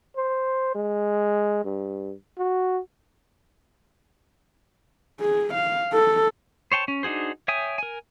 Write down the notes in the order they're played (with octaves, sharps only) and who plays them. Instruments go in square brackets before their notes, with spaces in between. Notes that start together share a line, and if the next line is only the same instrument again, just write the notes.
[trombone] C5
G#3
G2
F#4
[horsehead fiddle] G#4
F5
A4
[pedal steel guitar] C5 C#5 G5 A5
C#4
D4 D#4 F#4 G#4 C5
C#5 E5 G5 G#5 D#6
A#4 G#5